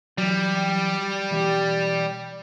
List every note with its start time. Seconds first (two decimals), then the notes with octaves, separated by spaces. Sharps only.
0.18 E3 F#3 G3
1.31 B1 E3 G4